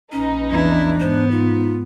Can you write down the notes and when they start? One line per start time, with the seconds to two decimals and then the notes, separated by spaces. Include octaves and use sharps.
0.12 A#1 C#4 D#4 B4
0.51 E2 D4 E4
1.00 G#2 B3 C5
1.31 D#4 F4